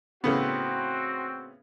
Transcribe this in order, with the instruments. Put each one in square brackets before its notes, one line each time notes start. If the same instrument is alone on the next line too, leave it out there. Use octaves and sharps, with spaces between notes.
[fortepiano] A2 C#3 B3 [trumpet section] C4 F#4